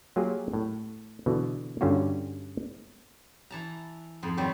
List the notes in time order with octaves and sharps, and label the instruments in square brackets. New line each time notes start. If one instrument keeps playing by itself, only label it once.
[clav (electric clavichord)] F#3 A#3 F4 G4 G#4
A2
B2 D3 E3
G2 D3 G3 C#4 F4 F#4
[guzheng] E3 A5 A#5
F2 G#2
D#3 F#3 G3 C4